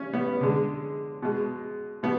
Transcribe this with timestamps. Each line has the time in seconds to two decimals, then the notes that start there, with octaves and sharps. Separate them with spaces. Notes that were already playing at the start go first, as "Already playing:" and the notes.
Already playing: C#4
0.13 B3
0.41 D3 G#3
1.22 B2 G#3
2.03 B2 B3